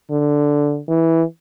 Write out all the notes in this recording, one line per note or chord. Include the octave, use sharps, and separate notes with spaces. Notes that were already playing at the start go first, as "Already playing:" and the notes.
D3
E3